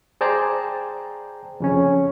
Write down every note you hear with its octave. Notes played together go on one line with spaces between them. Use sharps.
G#4 C5 D5 G5 A5 A#5
F2 C#3 C#4